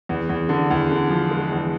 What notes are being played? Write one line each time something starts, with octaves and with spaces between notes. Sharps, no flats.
E2
E2
D3
E2
D3
F3
G#3
E2